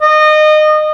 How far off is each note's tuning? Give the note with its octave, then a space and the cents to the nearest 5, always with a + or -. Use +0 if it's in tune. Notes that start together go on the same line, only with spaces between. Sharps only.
D#5 -25